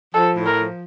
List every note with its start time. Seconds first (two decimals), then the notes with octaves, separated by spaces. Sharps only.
0.14 F3 A4
0.36 A2
0.46 A#4
0.57 F3